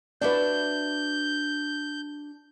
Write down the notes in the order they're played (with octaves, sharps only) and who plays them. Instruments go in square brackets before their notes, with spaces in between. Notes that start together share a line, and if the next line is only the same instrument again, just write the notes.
[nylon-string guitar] D4 F#4 E5 [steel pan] B4 D5 [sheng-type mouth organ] G6